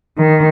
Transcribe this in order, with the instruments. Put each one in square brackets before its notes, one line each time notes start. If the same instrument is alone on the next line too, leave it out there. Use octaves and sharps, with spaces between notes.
[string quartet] D#3